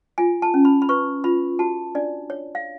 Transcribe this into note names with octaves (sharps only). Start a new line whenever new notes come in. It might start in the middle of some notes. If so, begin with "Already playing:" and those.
F4 G#5
A5
C#4
B5
B5
B4 C#6
F4 B5
F#4 A5
D4 D5
C#5
F5